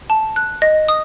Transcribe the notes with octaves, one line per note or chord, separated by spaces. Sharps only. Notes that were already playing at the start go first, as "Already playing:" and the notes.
A5
F#6
D#5
D#6